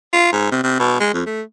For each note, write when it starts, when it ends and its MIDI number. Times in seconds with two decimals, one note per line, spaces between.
0.13 0.29 65
0.33 0.49 44
0.51 0.59 48
0.63 0.78 48
0.79 0.99 47
1.00 1.13 56
1.13 1.24 41
1.26 1.42 57